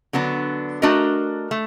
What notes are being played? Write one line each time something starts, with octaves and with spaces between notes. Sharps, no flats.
D3 F#3 B3 D4
A3 D4 F#4 A#4 D#5
A3